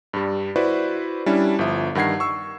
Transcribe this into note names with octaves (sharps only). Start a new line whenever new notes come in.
G2 G3
E4 F#4 B4 C5 D5
G3 C#4 D4 E4
G1 F3 E5
G2 D#3 F#5 G#6 C7
C#6 E6